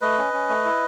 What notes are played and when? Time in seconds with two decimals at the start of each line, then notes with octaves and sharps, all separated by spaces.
0.01 A3 B4 D#5
0.18 C#4
0.33 C#4
0.49 A3
0.65 E4